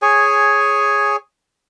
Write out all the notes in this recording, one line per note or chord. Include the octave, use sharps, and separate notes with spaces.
G#4 C#5 G#5